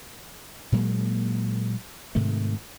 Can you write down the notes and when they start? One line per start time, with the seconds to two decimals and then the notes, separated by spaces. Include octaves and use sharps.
0.72 A#2 F#3 G#3 A#3
2.15 G#2 C3 D#3 A3